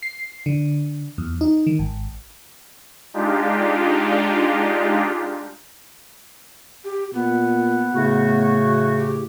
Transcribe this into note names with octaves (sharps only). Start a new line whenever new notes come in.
C7
D3
E2
D#4
D#3
G#1
G#3 D4 D#4 F4 G4
G4
A#2 B3
A2 C#3 A3 F#4
G4